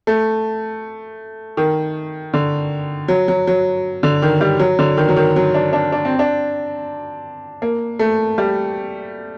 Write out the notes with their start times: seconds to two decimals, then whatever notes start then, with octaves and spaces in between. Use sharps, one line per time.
0.07 A3
1.57 D#3
2.34 D3
3.08 F#3
3.28 F#3
3.47 F#3
4.03 D3
4.22 D#3
4.41 G3
4.59 F#3
4.79 D3
4.97 D#3
5.08 F#3
5.17 D#3
5.36 F#3
5.55 D4
5.73 D4
5.92 D4
6.05 C4
6.19 D4
7.62 A#3
7.99 A3
8.38 G3